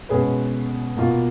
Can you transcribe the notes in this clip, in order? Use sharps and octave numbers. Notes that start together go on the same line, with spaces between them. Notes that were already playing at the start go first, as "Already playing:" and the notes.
B2 G#3 C#4 G#4 B4
B2 A#3 F4